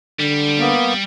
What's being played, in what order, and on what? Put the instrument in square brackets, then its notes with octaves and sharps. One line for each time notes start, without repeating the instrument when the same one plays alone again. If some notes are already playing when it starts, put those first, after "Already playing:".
[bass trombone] D3 [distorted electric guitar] G3
[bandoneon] A#3 B3